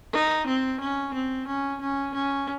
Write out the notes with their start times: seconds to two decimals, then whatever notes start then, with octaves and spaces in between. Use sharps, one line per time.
0.13 D#4
0.47 C4
0.80 C#4
1.13 C4
1.47 C#4
1.81 C#4
2.14 C#4